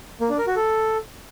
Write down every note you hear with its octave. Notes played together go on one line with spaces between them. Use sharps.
A#3
D4
A#4
F#4
A4